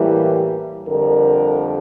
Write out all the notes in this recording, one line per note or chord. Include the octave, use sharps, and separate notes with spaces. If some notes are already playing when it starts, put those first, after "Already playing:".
Already playing: A2 E3 G3 A#3
F2 D3 G3 A#4